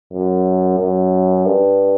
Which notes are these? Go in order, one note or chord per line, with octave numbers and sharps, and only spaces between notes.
F#2
F#2
G2